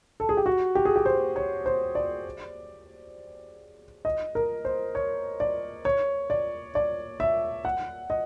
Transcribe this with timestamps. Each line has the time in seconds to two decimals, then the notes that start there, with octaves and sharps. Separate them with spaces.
0.20 A4
0.29 G#4
0.37 G4
0.46 F#4
0.75 G4
0.85 G#4
0.96 G4
1.06 C5
1.36 C#5
1.66 C5
1.95 D5
4.05 D#5
4.35 A#4
4.65 C5
4.95 C#5
5.40 D5
5.85 C#5
6.30 D5
6.75 D5
7.20 E5
7.65 F#5
8.10 D#5